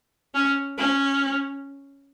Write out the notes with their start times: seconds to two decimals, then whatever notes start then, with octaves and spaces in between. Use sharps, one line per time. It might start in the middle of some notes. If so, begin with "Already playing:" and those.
0.34 C#4
0.78 C#4